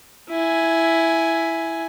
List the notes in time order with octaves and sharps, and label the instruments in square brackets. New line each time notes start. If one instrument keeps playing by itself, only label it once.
[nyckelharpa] E4 G#5